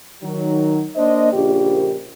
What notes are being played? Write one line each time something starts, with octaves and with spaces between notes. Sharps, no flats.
D#3 F#3
A#3 D4 C5 D#5
A#1 C#3 G4